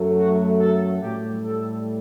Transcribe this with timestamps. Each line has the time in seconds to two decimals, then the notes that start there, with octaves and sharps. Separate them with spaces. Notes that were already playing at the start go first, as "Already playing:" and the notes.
Already playing: F#2 F#3 A3
0.18 F#4
0.60 A4
1.02 A2 G3 G4
1.45 A4